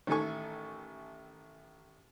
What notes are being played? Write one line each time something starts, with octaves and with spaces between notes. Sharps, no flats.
A1 D#3 A3 A4 G#5 C#6